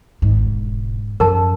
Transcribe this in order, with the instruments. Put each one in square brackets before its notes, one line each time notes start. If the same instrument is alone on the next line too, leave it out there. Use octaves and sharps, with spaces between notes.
[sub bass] G#1 [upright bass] G#2
[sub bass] E1
[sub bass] F#2 [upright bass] F3 [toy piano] A#4 A5